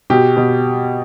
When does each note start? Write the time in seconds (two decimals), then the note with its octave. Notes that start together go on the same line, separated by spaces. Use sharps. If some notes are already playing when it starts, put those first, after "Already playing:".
0.10 B2 G4
0.37 B2